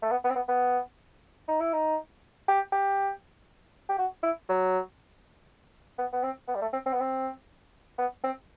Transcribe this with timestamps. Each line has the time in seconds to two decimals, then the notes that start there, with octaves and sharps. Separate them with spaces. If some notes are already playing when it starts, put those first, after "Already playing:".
0.03 A3
0.11 B3
0.24 B3
0.30 C4
0.36 B3
0.49 B3
1.48 D#4
1.61 E4
1.74 D#4
2.49 G4
2.73 G4
3.89 G4
3.99 F#4
4.23 E4
4.49 F#3
5.98 B3
6.13 B3
6.23 C4
6.48 B3
6.55 G3
6.62 A3
6.73 C4
6.86 C4
6.93 B3
7.01 C4
7.99 B3
8.24 C4